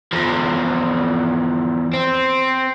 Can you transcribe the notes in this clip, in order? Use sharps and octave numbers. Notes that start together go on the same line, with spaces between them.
E2 F3
C4